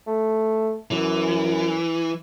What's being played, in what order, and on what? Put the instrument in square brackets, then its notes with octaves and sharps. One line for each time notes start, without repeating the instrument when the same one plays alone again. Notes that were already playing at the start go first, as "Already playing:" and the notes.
[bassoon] A3
[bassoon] F#2 [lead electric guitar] E3